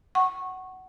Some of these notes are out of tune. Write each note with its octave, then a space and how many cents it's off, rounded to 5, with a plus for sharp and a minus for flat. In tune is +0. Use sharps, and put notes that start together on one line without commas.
F#5 +15 C#6 -15